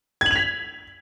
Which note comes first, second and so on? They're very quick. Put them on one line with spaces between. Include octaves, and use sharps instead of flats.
G#6 F#7 F7 B6